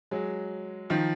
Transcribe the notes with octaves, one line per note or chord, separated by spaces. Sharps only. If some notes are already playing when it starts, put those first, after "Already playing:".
F#3 G#3
D#3 F3